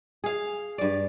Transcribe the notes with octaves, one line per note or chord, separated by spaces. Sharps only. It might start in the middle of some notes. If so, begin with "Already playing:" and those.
G#4 F5
G2 D5